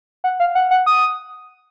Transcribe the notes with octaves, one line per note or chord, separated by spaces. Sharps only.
F#5
F5
F#5
F#5
D#6